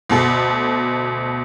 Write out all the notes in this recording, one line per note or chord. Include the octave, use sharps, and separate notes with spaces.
D2 B2 A4